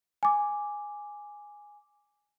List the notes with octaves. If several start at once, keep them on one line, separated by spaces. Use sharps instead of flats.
G#5 D6